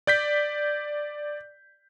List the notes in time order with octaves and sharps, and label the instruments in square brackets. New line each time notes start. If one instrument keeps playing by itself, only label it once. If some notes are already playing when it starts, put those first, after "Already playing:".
[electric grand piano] D5 G6 B6